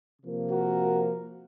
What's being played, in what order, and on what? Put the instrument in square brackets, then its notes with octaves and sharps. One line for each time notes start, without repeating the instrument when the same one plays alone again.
[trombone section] C3 F3 A#3
F#4 A#4